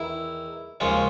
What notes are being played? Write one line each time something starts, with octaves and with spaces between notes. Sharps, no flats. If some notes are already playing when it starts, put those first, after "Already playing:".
Already playing: E2 D#3 E4
D#2 C#3 F3 G#3 C#4 F4